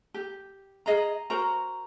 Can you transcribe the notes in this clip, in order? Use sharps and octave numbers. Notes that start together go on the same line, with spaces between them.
G4
G#4 D#5 F5 A#5
F#4 A#4 C5 A#5